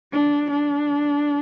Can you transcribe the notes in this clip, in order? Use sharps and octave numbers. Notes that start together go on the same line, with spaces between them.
D4
D4